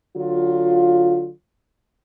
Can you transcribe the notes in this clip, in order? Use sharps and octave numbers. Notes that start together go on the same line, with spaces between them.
D3 F#3 F4